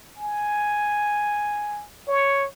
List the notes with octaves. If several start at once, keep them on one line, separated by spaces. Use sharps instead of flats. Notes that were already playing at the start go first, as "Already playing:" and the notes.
G#5
C#5